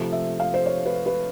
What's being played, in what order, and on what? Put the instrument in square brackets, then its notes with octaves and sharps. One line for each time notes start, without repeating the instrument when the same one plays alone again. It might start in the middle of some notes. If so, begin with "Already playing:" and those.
Already playing: [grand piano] C3 F3 A3
[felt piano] E5
F5
C5
C#5
B4
B4